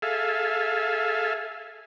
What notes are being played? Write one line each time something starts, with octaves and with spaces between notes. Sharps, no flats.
G#4 A4 E5 F5